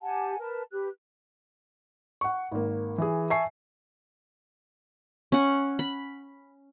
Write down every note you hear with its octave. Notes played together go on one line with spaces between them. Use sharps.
G4 F#5 G#5 A5
A#4 B4 A5
G4 B4 F#6
F#5 C#6
G#1 A#3
E3 G#4
E5 G#5 A5 C#6 C7
C#4 F#5
B5